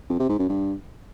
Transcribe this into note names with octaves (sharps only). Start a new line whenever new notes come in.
F2
C3
G#2
F#2
G2